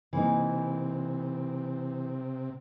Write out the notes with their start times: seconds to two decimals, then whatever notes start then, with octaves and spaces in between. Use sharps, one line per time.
0.13 C3 E3 A#3 D#4